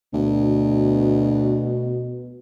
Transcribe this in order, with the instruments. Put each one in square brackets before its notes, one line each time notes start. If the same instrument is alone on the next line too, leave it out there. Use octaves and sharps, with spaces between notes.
[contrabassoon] D2 [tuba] B2